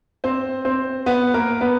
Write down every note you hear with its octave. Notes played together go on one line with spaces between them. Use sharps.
C4 C5
C4 C5
B3 B4
A#3 A#4
B3 B4